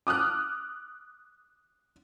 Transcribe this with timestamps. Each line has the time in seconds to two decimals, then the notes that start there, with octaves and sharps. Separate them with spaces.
0.07 D6 D#6 F6 F#6